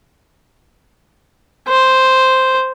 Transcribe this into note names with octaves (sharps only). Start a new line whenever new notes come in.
C5